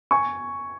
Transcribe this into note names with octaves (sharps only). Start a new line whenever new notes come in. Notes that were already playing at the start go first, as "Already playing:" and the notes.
G#5 C#6